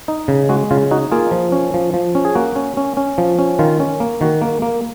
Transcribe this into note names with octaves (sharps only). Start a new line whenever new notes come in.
D#4
C#3
G#3 F#4
C#3 F4
D#4 F#4
A#3 F4 G#4
F3
C#4
F3
F3
C#4
G#4
A#3 F#4
C#4
C#4
C#4
F3
C#4
D#3 F4
C#4
A#3
D#3 F#4
A#3
A#3